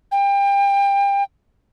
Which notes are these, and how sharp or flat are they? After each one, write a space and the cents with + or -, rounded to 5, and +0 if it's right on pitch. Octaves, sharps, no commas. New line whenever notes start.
G5 +30